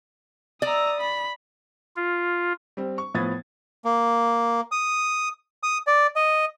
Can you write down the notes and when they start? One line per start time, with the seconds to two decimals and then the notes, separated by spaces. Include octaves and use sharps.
0.62 D5 E5 A#5 D#6 E6
1.00 B5 D#6
1.96 F4
2.77 G3 C4
2.98 C#6
3.14 A2 F3 B3 D#6 G#6 A6
3.85 A#3
4.72 D#6
5.63 D#6
5.87 D5
6.16 D#5